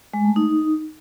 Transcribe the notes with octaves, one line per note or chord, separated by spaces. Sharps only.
G#3
A3
D#4